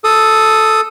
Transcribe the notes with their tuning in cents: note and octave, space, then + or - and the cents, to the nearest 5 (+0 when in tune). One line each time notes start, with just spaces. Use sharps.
A4 +0 D#6 +0